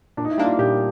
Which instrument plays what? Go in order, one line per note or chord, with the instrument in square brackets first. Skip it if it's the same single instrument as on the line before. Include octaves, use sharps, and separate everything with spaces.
[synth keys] A#2 [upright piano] D4
[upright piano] D#4
E4
[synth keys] G3 A#3 D4
[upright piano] F4
[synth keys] A#2 [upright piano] G4